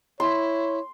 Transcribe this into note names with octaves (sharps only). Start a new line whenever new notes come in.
E4 C#5 C6